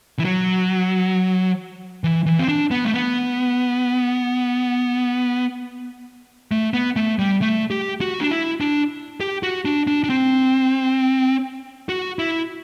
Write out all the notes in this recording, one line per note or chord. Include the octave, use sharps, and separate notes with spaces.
E3
F#3
E3
E3
C4
D4
B3
A3
B3
A3
B3
A3
G3
A3
G4
F#4
D4
E4
D4
G4
F#4
D4
D4
D4
C4
F#4
E4